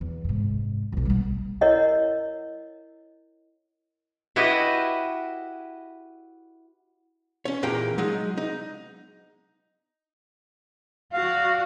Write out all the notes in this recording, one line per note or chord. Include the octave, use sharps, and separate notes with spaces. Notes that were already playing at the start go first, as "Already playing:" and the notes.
E2
G#2 C3
B1 E2
G3 B3
E4 A#4 C#5 D#5 F#5
E4 F#4 G4 B4 D#5 E5
C#4 C#5
E2 A#2 A#3 G4 G5 A#5
F#3 G#3 D#4
D#4
F#4 D5 F5